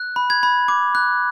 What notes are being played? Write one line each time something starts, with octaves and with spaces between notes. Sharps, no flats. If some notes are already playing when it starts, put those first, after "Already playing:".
Already playing: F#6
B5
G#6
B5
D6
F#6